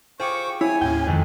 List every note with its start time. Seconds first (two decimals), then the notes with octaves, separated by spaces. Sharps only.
0.20 F4 G#4 C5 G5 C#6 D6
0.61 E4 C#5 G#5
0.81 D#2 A2 C#4 G5
1.07 F2 D#3 G#3